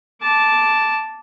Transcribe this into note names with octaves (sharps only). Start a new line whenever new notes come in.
A5 D6